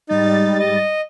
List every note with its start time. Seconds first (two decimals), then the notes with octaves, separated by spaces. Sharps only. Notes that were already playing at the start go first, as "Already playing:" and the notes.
0.09 G#2 G3 D#4 A6
0.59 D#5